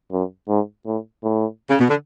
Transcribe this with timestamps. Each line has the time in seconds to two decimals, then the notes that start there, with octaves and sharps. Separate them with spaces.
0.12 F#2
0.49 G#2
0.86 A2
1.23 A2
1.70 C#3
1.79 B2
1.89 D3